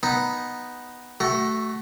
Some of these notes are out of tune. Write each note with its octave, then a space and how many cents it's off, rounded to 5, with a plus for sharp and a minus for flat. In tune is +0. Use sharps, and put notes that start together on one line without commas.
B3 +0 D#4 +0
A3 +0 F#4 +25